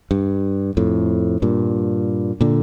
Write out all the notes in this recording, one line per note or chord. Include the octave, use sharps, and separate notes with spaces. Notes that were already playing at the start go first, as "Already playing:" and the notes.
G2
F2 A2
G2 A#2
A#2 D3